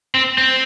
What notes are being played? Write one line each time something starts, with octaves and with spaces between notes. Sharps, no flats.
C4
C4